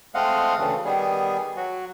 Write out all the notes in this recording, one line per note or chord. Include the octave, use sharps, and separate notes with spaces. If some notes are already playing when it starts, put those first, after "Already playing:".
G#3 A3 C4 D#5 F5 F#5
D2 C#3 E3 A3
D#3 G3 B3 G#4
F#3 F#4